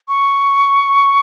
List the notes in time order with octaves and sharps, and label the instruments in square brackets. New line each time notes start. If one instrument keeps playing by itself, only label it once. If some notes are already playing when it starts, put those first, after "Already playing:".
[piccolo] C#6